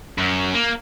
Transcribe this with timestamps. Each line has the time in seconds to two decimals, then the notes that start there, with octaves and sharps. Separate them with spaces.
0.18 F#2
0.54 A#3